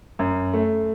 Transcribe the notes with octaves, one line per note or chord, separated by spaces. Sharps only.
F#2
A3